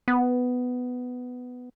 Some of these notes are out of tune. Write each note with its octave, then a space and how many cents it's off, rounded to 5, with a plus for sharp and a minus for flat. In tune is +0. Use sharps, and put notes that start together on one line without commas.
B3 +10